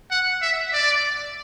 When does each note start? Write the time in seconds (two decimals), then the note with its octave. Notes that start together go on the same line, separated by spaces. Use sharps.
0.11 F#5
0.42 E5
0.73 D5